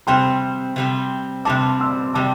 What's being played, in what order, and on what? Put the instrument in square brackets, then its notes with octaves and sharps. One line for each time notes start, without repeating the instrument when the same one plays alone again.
[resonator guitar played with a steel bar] C3 G3 C4 [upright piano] G5 C6
[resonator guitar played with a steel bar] C3 G3 C4
[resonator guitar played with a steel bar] C3 G3 C4 [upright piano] A5 D6
[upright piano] C6 E6
[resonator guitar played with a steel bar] C3 G3 C4 [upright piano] A5 D6